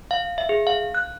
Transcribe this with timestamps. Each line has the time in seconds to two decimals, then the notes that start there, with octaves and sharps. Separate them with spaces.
0.11 F5
0.38 E5
0.49 G#4
0.67 F5
0.95 F#6